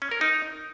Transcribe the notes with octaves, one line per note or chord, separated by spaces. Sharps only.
C#4
A#4
D#4